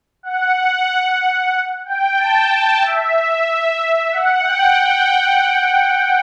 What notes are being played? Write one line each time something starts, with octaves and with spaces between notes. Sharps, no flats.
F#5
G5
A5
G5
E5
E5
F#5
G5
F#5